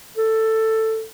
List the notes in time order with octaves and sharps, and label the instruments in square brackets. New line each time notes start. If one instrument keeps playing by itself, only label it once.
[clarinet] A4